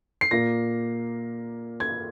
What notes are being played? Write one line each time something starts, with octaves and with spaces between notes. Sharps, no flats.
C7
A#2 A#3 A#6
G#6